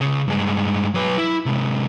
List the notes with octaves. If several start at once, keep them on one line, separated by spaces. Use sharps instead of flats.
C#2 C#3
G2 G#3
F#3 B4
E4
C3 G#3